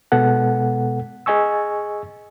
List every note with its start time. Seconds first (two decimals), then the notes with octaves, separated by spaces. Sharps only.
0.12 B2 G#3 B3 A4 F#5
1.26 G#4 D#5 G#5 C#6 E6